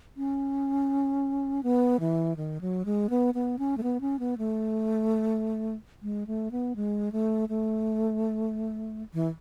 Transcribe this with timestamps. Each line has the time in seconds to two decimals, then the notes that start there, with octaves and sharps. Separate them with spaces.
0.17 C#4
1.63 B3
2.00 E3
2.37 D#3
2.61 F#3
2.85 G#3
3.10 B3
3.34 B3
3.59 C#4
3.78 A3
3.83 B3
4.01 C#4
4.19 B3
4.38 A3
6.03 G#3
6.27 A3
6.51 B3
6.76 G#3
7.12 A3
7.49 A3
9.14 E3